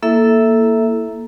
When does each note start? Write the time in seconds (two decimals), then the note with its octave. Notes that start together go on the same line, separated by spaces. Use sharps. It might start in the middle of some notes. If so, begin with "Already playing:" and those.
0.03 A#3 E4 A4 E5